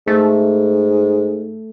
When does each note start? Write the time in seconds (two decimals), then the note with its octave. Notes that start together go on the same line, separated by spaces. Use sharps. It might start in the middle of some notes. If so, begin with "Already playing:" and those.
0.07 G#2 A3